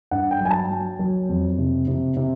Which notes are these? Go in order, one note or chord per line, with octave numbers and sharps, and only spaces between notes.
G2 F#5
G5
F#3 G#5
A5
F#3
F#3
F2
C3
C3
C3